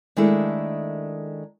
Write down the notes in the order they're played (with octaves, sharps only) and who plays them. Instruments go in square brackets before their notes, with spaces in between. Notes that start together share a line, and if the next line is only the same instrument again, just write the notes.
[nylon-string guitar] D#3 G#3 A3 D4 E4 A4